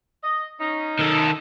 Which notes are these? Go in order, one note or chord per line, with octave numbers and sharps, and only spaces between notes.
D#5
C#4 D#4
D#3 A4